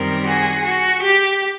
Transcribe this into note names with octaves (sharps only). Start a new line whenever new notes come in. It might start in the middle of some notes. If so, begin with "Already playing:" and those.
Already playing: F#2 D#3 G3 C4 A#4
F#4 G#4
F#4
G4